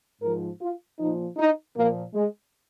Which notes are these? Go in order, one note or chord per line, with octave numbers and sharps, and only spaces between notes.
G#2 F3 A#4
F4
A#2 F3 D#4
D#4
A#2 F3 A#3
G#3